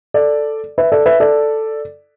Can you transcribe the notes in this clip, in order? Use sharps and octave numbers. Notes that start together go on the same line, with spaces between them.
A4 D5
B4 E5
A4 D5
B4 E5
A4 D5